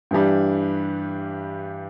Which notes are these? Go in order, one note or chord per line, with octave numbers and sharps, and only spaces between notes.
G2 E3 G3 D4